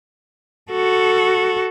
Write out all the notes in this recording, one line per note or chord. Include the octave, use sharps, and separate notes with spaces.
F#4 A4